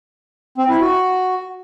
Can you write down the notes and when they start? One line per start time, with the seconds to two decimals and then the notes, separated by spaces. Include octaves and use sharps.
0.58 C4
0.69 E4
0.81 F#4